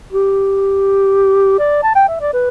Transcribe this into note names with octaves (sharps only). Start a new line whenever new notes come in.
G4
D5
A5
G5
E5
D5
B4